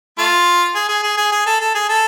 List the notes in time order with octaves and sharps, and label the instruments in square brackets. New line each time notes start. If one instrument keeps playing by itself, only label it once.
[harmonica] A3 F4
G#4
G#4
G#4
G#4
G#4
A4
A4
G#4
A4